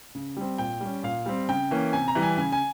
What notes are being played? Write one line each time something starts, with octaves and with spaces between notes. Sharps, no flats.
C#3
G3 C4
A#2 G5
G3 C#4
A#2 F5
G3 C4
C#3 G5
E3 A#3 C#4
C3 G#5
A#5
E3 G3
G#5
C#3 G#5
G#5